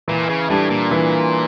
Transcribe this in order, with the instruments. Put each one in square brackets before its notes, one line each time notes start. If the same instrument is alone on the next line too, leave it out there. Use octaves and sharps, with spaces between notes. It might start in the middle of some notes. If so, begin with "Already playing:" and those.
[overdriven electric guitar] A#2 [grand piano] E3
[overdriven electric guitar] C#3
[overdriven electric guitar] A2 [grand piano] G3 D4
[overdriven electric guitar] A#2
[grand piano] E3